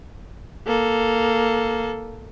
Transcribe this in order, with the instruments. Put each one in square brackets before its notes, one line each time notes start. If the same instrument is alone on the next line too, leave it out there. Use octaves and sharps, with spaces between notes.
[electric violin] A#3 A4